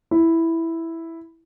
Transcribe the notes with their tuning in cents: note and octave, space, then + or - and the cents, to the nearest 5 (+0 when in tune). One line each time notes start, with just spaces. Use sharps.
E4 +0